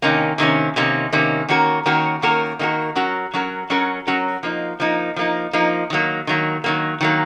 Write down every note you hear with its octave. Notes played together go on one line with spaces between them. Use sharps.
C3 D#3 A#3 C#4
C3 D#3 A#3 C#4
C3 D#3 A#3 C#4
C3 D#3 A#3 C#4
D#3 A#3 C#4 F#4 A#4
D#3 A#3 C#4 F#4 A#4
D#3 A#3 C#4 F#4 A#4
D#3 A#3 C#4 F#4 A#4
F#3 C#4 F#4 A#4
F#3 C#4 F#4 A#4
F#3 C#4 F#4 A#4
F#3 C#4 F#4 A#4
F3 A#3 D#4
F3 A#3 D#4
F3 A#3 D#4
F3 A#3 D#4
D#3 F#3 A#3
D#3 F#3 A#3
D#3 F#3 A#3
D#3 F#3 A#3